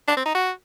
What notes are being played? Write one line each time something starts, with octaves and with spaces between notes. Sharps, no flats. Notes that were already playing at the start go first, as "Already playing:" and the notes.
D4
C4
D#4
F#4